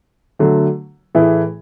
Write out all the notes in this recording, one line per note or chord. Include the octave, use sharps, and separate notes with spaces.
D3 F#3 A3
A2 E3 A3 E4 G#4